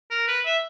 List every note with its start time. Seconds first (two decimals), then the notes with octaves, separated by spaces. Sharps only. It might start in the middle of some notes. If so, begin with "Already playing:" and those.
0.11 A#4
0.28 B4
0.45 E5